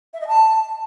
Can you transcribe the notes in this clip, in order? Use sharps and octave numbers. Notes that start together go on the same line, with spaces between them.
E5
D#5
A5